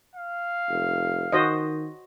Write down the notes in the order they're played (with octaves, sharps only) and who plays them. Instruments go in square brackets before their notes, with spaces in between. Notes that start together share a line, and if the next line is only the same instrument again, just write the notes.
[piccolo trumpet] F5
[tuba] F1
[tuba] D#3 [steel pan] F#4 C5 D#5